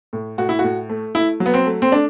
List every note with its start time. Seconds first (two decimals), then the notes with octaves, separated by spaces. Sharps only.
0.13 A2
0.38 A2 F#4
0.49 E4
0.59 F#4
0.64 A2
0.89 A3
1.15 A3 E4
1.40 F#3
1.46 B3
1.54 C4
1.66 A3
1.82 C4
1.92 A3 D4